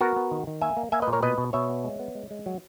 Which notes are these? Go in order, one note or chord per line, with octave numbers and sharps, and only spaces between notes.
B3 F#4 A#4
B3
D#3
D#3
A#3 E5 G#5
A#3
A#3 E5 G#5
B4 D#5
A#2
A#4 C#5
B2 B4 D#5
B2
B2 C#5 E5
B3
G#3
B3
G#3
G#3
F#3